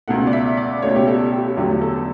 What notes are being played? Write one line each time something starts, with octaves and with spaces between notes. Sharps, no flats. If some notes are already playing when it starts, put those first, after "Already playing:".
C#2 B2 A3 F#5
D5
E5
D5
C#2 B2 A3 C#5
G4
A4
G4
E2 D3 F#3 A3 G4
A4